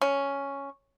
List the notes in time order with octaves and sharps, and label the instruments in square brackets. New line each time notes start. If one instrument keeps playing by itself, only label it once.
[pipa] C#4